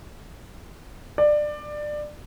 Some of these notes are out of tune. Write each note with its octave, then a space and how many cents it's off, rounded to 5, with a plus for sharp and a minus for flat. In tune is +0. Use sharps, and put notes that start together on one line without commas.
D5 +20